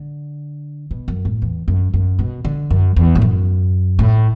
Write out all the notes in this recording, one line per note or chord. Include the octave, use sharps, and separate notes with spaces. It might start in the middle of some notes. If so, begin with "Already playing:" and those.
Already playing: D3
B2
F#2
A2
E2
F#2
F#2
B2
D3
F#2
E2
A2
F#2
A2